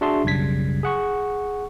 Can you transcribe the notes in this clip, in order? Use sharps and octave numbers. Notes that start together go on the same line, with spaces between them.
D4 F#4 G#4 E5 A5 C6
B1 F#2 C#3 G3 G#6 B6
G#4 F#5 C#6